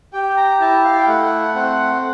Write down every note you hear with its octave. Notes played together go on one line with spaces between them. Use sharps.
G4 G5
A#5
E4 A5
F5
G5
A3 F#5
C4 F#5